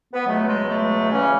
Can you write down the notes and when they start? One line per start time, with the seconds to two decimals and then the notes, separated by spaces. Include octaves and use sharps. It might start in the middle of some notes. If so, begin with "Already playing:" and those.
0.14 B3
0.25 C#2 B2 F#3 A3
0.47 G#3
0.68 A3
1.11 E2 C#3 E3 C#4